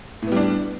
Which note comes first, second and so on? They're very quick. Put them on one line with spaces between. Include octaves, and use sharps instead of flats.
A2 B3 G3 D4